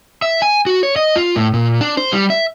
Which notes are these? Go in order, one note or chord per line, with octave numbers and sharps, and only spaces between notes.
E5
G#5
F#4
C#5
D#5
F4
A2
A#2
D4
C5
G3
E5